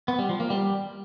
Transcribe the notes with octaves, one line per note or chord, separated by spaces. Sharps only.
B3
G3
F3
A#3
G3